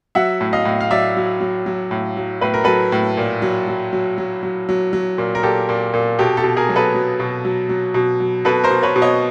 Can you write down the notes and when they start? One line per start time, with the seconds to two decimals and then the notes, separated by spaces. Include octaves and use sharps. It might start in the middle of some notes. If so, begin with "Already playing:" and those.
0.15 F#3 E5 F#5
0.41 A2
0.53 D#5 F5
0.65 A2
0.81 F5
0.91 F#3 D5 E5
1.17 F#3
1.41 F#3
1.66 F#3
1.91 A2
2.17 F#3
2.41 A2 B4
2.54 A#4
2.64 F#3 A4 B4
2.92 A2
3.17 A#2
3.42 F#3
3.68 F#3
3.93 F#3
4.18 F#3
4.43 F#3
4.69 F#3
4.93 F#3
5.18 A#2
5.35 A#4
5.43 A#2 G4 A4
5.69 A#2
5.94 A#2
6.19 B2 G4 A4
6.37 G4 A4
6.44 B2
6.57 G#4 A#4
6.69 F#3
6.76 A4 B4
6.95 F#3
7.20 B2
7.45 F#3
7.69 F#3
7.94 B2
8.20 F#3
8.45 B2 A4 B4
8.64 A#4 C5
8.71 B2
8.83 B4 C#5
8.96 B2
9.02 C#5 D#5